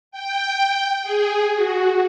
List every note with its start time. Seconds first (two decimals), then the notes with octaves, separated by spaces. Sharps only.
0.11 G5
1.03 G#4
1.55 F#4